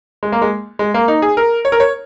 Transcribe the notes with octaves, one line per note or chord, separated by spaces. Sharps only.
G#3
A#3
G#3
G#3
A#3
D#4
G#4
A#4
C#5
A#4
C#5